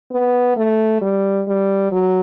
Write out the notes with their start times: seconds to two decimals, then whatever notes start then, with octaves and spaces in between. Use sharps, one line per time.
0.12 B3
0.57 A3
1.02 G3
1.48 G3
1.92 F#3